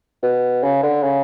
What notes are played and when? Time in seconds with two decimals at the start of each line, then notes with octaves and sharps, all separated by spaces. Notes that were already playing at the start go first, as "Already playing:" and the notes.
0.23 B2
0.63 C#3
0.83 D3
1.03 C#3